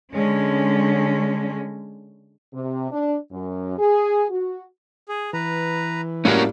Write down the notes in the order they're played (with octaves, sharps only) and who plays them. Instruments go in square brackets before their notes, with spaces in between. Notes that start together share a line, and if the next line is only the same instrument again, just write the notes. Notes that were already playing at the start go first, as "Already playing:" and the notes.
[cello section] D3 G#3 C#4
[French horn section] C3
D4
F#2
G#4
F#4
[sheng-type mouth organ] G#4
[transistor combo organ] E3 [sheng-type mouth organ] B4 A#5
[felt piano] A2 G3 A#3 [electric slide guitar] C#4 F#4 A#4 [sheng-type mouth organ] A5